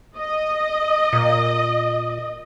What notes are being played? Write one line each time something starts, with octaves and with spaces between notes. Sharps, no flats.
D#5
A#2